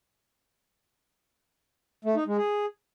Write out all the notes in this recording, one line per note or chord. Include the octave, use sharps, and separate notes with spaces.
A3
D#4
G#3
G#4